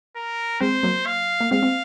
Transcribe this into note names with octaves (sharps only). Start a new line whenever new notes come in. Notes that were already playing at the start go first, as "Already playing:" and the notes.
A#4
G#3 C4 C5
F#3 A#3
F5
A#3
G#3 C4 F5
C4